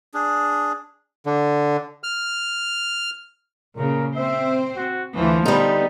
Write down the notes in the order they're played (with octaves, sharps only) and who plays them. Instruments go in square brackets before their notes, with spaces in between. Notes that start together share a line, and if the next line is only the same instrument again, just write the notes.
[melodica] D4 G#4
[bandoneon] D3
F6
[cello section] A#2 C#3 [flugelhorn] A#4
[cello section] C4 C5 [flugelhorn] E5
[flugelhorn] F#4
[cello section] D2 E3 [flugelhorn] F3
[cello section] D3 B3 [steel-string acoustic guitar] G3 D#4